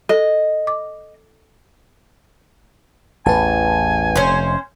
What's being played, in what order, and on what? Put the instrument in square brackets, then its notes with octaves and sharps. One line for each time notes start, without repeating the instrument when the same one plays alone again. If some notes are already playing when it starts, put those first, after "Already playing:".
[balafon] A4 [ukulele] D#5
[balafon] D6
[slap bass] A1 E2 [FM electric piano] B4 A5 [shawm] G#5
[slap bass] F1 [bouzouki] C#4 C5